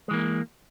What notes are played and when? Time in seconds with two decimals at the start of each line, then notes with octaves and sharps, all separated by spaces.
0.08 G#3
0.11 E3
0.13 A#3